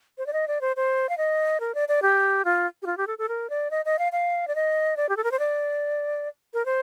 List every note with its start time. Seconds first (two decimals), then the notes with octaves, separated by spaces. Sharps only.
0.18 C5
0.26 D5
0.33 D#5
0.48 D5
0.61 C5
0.76 C5
1.09 F5
1.18 D#5
1.60 A#4
1.75 D5
1.88 D5
2.02 G4
2.45 F4
2.82 G4
2.86 F4
2.97 G4
3.07 A4
3.18 A4
3.29 A#4
3.50 D5
3.71 D#5
3.85 D#5
3.99 F5
4.12 F5
4.48 D5
4.55 D#5
4.97 D5
5.09 G4
5.17 A4
5.24 A#4
5.32 C5
5.39 D5
6.54 A#4
6.66 C5